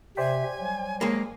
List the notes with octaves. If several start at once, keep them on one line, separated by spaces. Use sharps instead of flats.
C3 C5 D5 E5 G5 G#5
F#3 G3
G#3 A#3 G#5